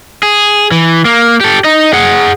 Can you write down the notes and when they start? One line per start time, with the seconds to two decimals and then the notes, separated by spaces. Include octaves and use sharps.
0.23 G#4
0.71 E3
1.05 A#3
1.41 G4 A4
1.64 D#4 D#5
1.93 G#4 F#5